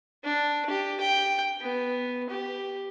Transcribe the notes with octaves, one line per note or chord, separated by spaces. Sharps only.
D4
G4
G5
B3
G4